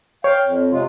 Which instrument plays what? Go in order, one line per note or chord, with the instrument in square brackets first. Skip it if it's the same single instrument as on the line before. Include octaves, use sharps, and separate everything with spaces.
[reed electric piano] C#5 [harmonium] F5 G5
[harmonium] F2
C3 G#3 F4